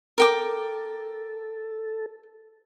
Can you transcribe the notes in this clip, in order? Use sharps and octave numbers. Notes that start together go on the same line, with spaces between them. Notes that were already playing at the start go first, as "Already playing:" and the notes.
A4 A#4 G5 D6